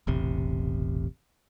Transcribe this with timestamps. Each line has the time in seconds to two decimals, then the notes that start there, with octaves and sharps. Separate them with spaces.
0.07 E1 A1 C3